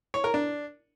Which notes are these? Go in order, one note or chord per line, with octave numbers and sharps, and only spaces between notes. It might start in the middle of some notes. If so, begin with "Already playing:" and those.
C#5
A#4
D4